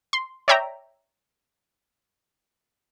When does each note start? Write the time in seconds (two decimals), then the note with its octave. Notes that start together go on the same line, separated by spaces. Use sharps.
0.13 C6
0.48 C#5 D5 E5 G5 A#5